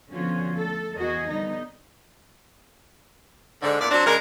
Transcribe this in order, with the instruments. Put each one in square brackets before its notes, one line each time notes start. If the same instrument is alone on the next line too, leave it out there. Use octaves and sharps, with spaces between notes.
[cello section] D3 F3 B3 C#4 F4 F#4
A3 A4
E2 F#4 G#4 A#4 D#5
D3 G3 B3 D#4
[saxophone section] G#2 D3
E2 A#2 D5
F#3 C4 D4
C#3 G#3 A#4